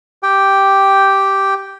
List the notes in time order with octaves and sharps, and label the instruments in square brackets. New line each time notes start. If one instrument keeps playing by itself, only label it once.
[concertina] G4 G5